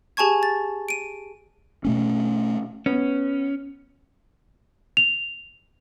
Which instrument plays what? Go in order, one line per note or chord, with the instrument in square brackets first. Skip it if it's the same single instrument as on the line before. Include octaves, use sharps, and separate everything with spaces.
[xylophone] G4 G#4 G#5 A5 C#6 G#6
A6
D7 D#7
[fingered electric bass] B2 A3 C#4
[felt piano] B3 [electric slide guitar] C#4
[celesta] F7